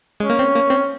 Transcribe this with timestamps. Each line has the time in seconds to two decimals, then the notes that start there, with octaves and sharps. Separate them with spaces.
0.20 G#3 C#4
0.30 A#3
0.39 C4
0.55 A#3
0.70 C4